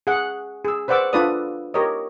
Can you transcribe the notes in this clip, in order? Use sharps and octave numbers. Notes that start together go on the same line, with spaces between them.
G#4 F#5
G#4 E6
B4 C5 D5 F#5 D6 E6
D4 F4 A4 B4 D5 D#6
G4 A#4 C#5 D#5